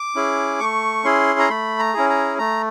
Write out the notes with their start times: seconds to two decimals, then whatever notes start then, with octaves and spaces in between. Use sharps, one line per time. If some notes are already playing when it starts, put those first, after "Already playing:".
Already playing: D6
0.15 C#4 E4 G#4
0.60 A3 C#6
1.04 C#4 E4 G#4 C6
1.39 A#5
1.50 A3 B5
1.79 A#5
1.94 C#4 E4 G#4
2.10 A#5
2.39 A3 A#5